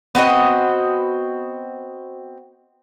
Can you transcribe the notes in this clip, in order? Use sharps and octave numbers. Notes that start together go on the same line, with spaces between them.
B3 C4 F#4 D#5